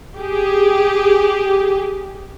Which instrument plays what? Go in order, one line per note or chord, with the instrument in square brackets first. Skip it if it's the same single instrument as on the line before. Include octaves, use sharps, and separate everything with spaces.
[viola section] G4 G#4